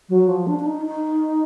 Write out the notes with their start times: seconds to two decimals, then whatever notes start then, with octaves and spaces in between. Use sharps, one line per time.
0.09 F#3
0.28 F3
0.47 D4
0.59 D4
0.66 D#4
0.86 D#4